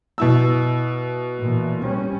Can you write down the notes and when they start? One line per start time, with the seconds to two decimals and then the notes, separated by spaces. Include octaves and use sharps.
0.18 B2 E4 E6
1.38 A#2 E3
1.82 G3 C#4